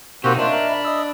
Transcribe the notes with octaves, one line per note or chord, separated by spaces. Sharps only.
B2 A#3 C4 D#4 F#4 G4
A#3 D4 F4 C5 D#5 E5
A#4
B5
D#5 D#6 E6